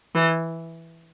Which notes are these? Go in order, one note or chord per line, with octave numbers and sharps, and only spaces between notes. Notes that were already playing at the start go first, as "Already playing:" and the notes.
E3